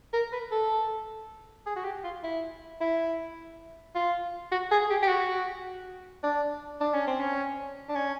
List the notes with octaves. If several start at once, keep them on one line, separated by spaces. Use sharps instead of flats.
A#4
B4
A4
G#4
F#4
G4
F4
E4
E4
F4
F#4
G#4
G4
G4
F#4
D4
D4
C#4
C4
C#4
D4
C#4